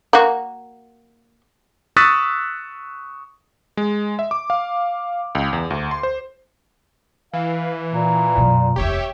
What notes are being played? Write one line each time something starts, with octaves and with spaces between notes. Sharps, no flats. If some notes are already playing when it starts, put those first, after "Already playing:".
A#3 F#4
C#6 D#6 E6 F#6 A6 B6
G#3
E5
D6
F5
C#2
E2
D2
C6
C5
E3 F5
A#2 A#3
F#2 B2
F1 D#2 G4 C#5 E5